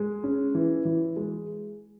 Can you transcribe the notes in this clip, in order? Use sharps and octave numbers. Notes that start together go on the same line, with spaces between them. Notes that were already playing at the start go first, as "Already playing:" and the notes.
Already playing: G#3
C#4
E3
E3
G#3